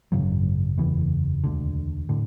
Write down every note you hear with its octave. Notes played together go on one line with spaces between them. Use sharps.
G#1 F#2 C#3 F#3
F#1 E2 C#3 E3
E1 D2 D3
A2 D3